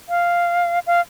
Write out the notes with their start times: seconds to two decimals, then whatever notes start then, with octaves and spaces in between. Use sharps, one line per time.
0.09 F5
0.87 F5